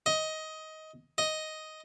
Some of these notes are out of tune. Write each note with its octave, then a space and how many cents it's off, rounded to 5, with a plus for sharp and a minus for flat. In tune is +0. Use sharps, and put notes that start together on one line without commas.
D#5 +15
D#5 +5